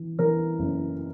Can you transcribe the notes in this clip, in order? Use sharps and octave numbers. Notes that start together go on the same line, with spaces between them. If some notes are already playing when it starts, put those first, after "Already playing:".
Already playing: E3
E3 A#4
F#1